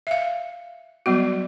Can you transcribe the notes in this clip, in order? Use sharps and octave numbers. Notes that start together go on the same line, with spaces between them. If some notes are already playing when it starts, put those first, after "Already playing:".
E5 F5
F#3 G3 B3 F#4